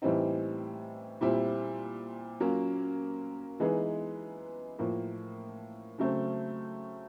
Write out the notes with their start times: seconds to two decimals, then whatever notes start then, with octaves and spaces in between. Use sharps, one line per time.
0.02 A2 E3 G3 C4 D#4
1.21 A#2 G3 C4 E4
2.40 F#3 A#3 C#4 F4
3.60 E3 G#3 B3 D#4 G#4
4.79 A2 F3 A#3
5.98 C#3 F#3 A3 C4